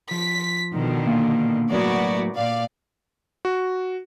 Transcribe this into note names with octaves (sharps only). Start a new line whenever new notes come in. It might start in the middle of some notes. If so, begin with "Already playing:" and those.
F3 B6
B2 D3 D#3
A#2 A#3 F5
A2 F#3 A#3 B3 F#4 D5
A#2 D5 F5
F#4